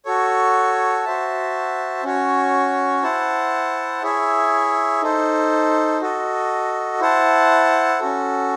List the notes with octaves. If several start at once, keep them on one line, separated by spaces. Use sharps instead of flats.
F#4 A4 C#5
F#4 C5 E5 A5
C#4 F#4 C#5
E4 C5 F#5 A5
E4 G#4 C#5 E5
D#4 A4 C5
F#4 A4 D#5
E4 C5 F#5 A5
C#4 F#4 A4